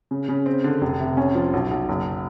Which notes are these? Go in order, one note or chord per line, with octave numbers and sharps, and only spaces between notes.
C#3
C#3
C4
D3
F1
C3
C#4
F3
B1
B1
F#1